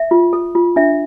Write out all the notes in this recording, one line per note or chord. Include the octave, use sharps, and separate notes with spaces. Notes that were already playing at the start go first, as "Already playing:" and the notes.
Already playing: E5
F4
A4
F4
D4 E5